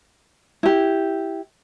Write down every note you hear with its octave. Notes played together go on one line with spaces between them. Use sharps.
E4 G4